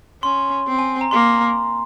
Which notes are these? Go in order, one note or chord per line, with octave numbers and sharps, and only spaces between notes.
C#4 C6
C4
G#5
A#5
A#3 C6